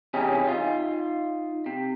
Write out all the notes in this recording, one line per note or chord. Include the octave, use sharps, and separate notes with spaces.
C3 E3 C#4 D#4 G4 G#4
D#4 F4
C3